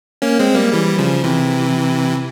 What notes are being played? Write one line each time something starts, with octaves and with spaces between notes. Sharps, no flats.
A#3 C#4
G#3 C4
G3 A#3
E3 G3
C#3 F3
C3 E3